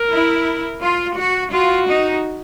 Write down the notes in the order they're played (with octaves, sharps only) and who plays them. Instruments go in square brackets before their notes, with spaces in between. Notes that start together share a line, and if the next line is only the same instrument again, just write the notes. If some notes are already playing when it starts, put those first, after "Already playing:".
Already playing: [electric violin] A#4
[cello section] E4
F4
F#4
[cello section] F4 [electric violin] F#4
[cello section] D#4